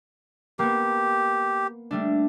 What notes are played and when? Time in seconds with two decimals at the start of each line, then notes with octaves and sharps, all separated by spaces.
0.59 A#3 B3 G4
1.91 G3 A3 D4